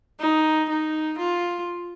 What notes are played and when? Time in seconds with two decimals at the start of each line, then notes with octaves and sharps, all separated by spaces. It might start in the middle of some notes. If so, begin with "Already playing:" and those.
0.20 D#4
0.69 D#4
1.18 F4